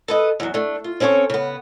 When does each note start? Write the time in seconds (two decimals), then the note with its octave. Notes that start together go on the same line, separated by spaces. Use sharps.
0.08 A4 B4 D#5
0.40 E2 F#3
0.54 A3 D4
0.84 F4
1.00 C4 C#4 E4 A4 C#5
1.30 C#3 B3